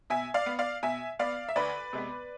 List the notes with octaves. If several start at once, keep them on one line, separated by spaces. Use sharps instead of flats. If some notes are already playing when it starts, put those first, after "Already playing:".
B2 E5 G#5
D5 F5
B3
D5 F5
B2 E5 G#5
B3 D5 F5
E5
D2 B4 D5
C3 G#3 B3